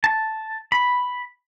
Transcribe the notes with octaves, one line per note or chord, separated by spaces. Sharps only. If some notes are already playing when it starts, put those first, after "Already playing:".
A5
B5